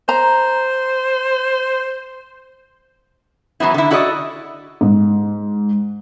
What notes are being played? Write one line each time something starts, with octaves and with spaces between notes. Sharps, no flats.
C5 A#5
E3 F#3 B3 E4
D3 E4
E4 F#4 A4 D5 D#5
G#2